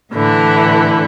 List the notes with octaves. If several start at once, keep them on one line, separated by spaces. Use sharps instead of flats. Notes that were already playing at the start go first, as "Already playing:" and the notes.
A2 D3 E3 E4